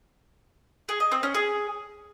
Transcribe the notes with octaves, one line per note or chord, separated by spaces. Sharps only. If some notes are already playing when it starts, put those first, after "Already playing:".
G#4
D#5
C4
C#4
G#4